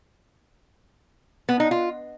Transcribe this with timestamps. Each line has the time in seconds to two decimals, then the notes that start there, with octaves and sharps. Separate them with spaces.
1.49 B3
1.60 D#4
1.71 F4